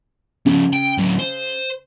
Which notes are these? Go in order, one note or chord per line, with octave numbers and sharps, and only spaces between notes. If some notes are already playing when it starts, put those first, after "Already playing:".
C#3 F3 C#4
G5
A2 F#3
C5